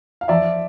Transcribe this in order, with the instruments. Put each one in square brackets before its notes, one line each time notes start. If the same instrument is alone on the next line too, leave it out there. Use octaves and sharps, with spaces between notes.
[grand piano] F5
F3 D5 E5